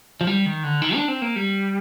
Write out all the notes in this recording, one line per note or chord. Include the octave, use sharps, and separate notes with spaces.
F3
G3
D#3
D3
D#3
D4
C4
A#3
G3